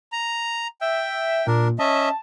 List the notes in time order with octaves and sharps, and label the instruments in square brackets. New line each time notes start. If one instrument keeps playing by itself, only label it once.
[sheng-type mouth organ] A#5
[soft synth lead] E5 [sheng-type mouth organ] G5
[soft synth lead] A#2 [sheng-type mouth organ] D4 A#4
[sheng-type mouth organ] C#4 D#5 E5 [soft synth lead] A5